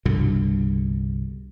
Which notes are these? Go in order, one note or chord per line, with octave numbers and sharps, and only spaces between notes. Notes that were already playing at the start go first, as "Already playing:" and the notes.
C2 G2 B2 D3